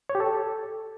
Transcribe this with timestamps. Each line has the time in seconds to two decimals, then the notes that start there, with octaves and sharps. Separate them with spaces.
0.09 C#5
0.15 G4
0.20 A4